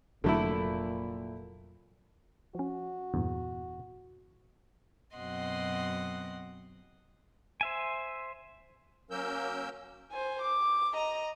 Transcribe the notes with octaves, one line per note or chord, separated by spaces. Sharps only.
F1 A#2 D3 F#3 A3 E4
F3 C#4 F#4
E2 G2 A#2
F#2 B2 C4 D#5 F#5 C6
C5 E5 G#5
F#3 A#3 C#4 A#4 E6 G6
C5 G#5
D6
D#5 A#5